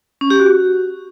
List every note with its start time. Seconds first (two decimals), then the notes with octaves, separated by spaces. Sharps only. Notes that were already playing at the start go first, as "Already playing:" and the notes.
0.21 C#4
0.30 G4
0.40 F#4